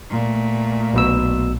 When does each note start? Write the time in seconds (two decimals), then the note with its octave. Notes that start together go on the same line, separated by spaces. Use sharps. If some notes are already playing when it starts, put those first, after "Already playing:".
0.10 A#2 A3
0.94 B1 B2 E6